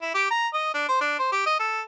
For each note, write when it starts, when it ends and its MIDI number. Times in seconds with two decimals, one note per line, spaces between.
0.01 0.14 64
0.14 0.25 67
0.30 0.47 82
0.53 0.71 75
0.74 0.84 62
0.88 1.01 72
1.01 1.16 62
1.19 1.32 72
1.32 1.45 67
1.46 1.56 75
1.59 1.81 69